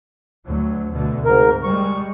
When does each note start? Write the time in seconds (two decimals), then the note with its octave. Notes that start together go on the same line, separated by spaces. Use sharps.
0.46 D2 F#3
0.91 D2 B2 D3
1.25 G#2 C3 A#4
1.63 G3 G#3 C#6